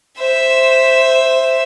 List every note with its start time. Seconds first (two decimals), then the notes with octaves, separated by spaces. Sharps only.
0.19 C5 E5